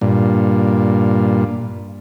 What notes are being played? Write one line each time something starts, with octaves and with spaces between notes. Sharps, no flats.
G2 A#2